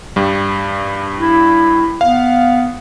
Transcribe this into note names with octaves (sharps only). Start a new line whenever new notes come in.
G2 G3
E4
B3 F5